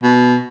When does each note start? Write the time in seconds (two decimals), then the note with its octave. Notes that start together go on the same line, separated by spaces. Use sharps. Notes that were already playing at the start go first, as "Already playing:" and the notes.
0.03 B2